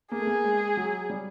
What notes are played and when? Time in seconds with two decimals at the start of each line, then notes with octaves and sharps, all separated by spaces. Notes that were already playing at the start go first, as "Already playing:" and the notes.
0.11 A#3 G#4
0.19 A3
0.27 A#3
0.44 G#3
0.77 F#3
1.10 G3